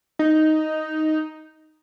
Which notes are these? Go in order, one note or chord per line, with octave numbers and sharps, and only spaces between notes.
D#4